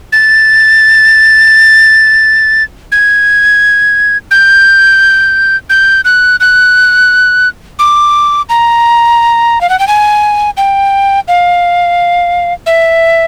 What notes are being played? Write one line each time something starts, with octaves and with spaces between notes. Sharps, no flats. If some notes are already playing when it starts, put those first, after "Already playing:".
A6
G#6
G6
G6
F#6
F#6
D6
A#5
F5
F#5
G5
G#5
G5
F5
E5